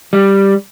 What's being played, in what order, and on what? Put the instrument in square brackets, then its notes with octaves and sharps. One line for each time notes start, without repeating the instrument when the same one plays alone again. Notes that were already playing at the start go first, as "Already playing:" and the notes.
[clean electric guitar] G3